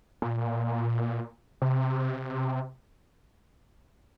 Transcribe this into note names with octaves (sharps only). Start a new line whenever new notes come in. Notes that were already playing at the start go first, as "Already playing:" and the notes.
A#2
C3